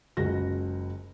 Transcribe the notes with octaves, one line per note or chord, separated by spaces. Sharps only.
F#1 C#2 F#4 A#6